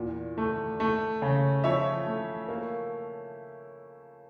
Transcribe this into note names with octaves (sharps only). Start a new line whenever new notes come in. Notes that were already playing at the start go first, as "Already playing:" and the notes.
Already playing: E2 A#2
A3
A3
C#3
F3 C#5 E5
A3
A#3